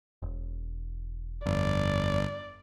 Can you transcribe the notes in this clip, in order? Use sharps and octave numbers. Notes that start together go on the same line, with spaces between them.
E1
G1 F2 D5